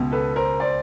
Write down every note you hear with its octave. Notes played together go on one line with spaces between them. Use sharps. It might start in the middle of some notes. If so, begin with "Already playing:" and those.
Already playing: C#2 B2
A4 B4
A#4 C5
C5 D5